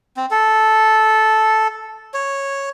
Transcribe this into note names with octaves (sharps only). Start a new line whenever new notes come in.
C4
A4
C#5